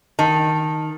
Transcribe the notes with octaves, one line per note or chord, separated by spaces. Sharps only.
D#3 A5